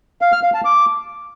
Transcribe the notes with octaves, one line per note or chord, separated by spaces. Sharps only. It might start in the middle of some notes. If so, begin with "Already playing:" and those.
F5
F6
F5
A5
D6